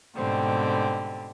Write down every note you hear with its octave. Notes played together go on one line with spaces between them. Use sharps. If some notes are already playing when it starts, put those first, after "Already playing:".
G#2 B2 D3 G3 C4